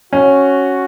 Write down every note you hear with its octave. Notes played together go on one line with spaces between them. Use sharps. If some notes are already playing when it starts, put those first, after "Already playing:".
C#4 F#4